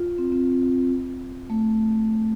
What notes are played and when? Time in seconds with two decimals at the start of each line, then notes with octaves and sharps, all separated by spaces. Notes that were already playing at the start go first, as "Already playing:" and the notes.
Already playing: F4
0.18 C4
0.32 C4
1.50 A3